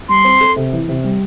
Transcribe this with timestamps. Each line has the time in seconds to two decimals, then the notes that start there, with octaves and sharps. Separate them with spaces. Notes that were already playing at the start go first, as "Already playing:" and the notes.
0.09 G3 C6
0.24 C4
0.41 A4
0.56 C3
0.73 E3
0.89 C3
1.04 G3